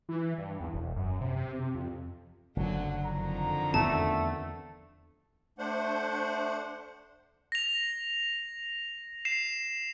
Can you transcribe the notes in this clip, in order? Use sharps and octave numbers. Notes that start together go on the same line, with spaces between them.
E3
G2
E2
E1
F#2
C3
C3
C3
F2
F#1 D3 F#3
F2 D3 D#3 A#5
E2 A3 B3 D4 A5
A3 D4 C5 F#5
A#6 F7
C7 E7